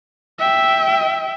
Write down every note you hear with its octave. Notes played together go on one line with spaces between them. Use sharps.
E5 G5